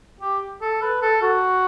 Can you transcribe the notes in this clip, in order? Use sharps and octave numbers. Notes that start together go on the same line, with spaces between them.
G4
A4
B4
A4
F#4